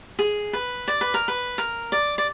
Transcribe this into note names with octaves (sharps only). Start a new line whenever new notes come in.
G#4
B4
D5
B4
A#4
B4
A#4
D5
D5